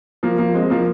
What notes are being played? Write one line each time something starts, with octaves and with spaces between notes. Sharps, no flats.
F3 A#3
F3 A#3
G#3 C4
F3 A#3